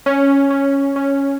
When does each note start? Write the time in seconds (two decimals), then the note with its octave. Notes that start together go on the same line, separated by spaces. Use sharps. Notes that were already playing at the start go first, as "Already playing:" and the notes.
0.06 C#4
0.50 C#4
0.96 C#4